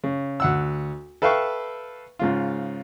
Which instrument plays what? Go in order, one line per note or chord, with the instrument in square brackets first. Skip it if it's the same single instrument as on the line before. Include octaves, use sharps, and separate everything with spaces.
[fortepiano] C#3
D2 F#5 E6
A4 B4 E5 F5 G5 C#6
G#2 C#3 F4